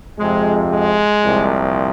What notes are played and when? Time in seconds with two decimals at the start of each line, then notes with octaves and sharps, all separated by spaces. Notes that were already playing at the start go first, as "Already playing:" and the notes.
0.18 F2 C3 F3 G#3
0.70 G#3
1.22 C2 A#2 F3